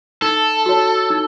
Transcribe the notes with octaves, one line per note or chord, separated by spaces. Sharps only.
D#4 A4
F#4 C#5
D#4